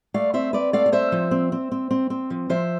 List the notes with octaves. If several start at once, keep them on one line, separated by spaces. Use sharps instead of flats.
A3 D5 F5
C4 C5 E5
C4 B4 D5
A3 D5 F5
F5
C4 C5 E5
F3
C4
C4
C4
C4
C4
F3
F3 C5 E5